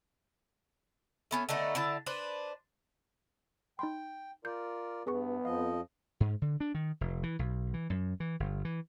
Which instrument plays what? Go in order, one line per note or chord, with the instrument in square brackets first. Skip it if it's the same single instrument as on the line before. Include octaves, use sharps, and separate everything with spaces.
[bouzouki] A3 B3 C#4
D3 A3 B3 D#4
D3 E4 A5
D4 B4 C5
[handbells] D#4 B5 C6 [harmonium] G5
[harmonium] F4 A#4 D5 [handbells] G6
[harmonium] G2 [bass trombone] B3 [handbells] G#4 B4 C#6
[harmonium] F2 F3 D#5 [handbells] F5
[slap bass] G#2
D3
D4
D#3
F1
E3
B1
E3
F#2
E3
G1
E3